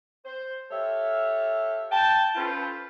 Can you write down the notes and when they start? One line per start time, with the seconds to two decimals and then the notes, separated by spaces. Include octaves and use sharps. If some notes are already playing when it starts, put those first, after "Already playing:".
0.26 C5
0.71 G4 A4 C#5 E5 F5
1.92 G5 A5
2.35 C#4 F4 A4 B4 C5